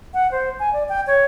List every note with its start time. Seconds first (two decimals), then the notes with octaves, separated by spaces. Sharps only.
0.14 F#5
0.31 C5
0.59 G#5
0.73 D5
0.89 G5
1.07 C#5